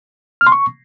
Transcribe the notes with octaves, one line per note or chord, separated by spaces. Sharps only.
F6
C6
C#6